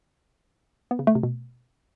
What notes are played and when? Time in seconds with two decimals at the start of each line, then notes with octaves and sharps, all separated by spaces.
0.91 B3
0.99 C#3
1.07 A3
1.15 C3
1.23 B2